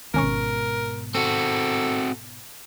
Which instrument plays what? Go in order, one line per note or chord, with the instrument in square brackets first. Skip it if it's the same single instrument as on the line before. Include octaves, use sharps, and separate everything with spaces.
[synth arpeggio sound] G#1 C#4 C#6 [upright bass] G#2 B2 [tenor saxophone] A#4
[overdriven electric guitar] C4 F#4 [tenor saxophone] A4